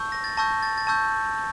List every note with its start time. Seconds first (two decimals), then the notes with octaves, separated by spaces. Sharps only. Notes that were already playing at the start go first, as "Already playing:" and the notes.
Already playing: A5 C#6 E6 G6
0.12 A#6
0.24 A6
0.37 A5 C#6 E6 G6 A#6
0.62 A6
0.78 A6
0.87 A5 C#6 E6 G6 G#6